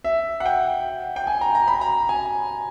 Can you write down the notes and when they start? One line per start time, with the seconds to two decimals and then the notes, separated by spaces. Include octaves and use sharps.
0.04 E5
0.40 F#5
0.46 G5
1.16 G5
1.27 G#5
1.41 A#5
1.55 A#5
1.68 B5
1.81 A#5
2.09 G#5